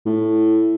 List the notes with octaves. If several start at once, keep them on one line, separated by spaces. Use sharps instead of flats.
A2